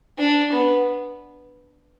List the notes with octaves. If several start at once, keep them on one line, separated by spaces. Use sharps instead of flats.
D4
B3